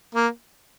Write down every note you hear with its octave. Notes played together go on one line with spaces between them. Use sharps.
A#3